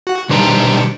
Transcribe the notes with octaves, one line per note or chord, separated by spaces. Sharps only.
F#4 F#5
B2 D#3 G3 D4 C5 A#5